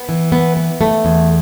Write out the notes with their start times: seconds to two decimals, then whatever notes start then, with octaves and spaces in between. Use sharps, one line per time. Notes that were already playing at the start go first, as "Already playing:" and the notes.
Already playing: B3
0.09 E3
0.32 B3
0.57 B3
0.81 A3
1.05 E2